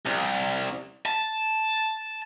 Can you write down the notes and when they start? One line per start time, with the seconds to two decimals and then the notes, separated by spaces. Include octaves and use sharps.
0.06 C2
1.06 A5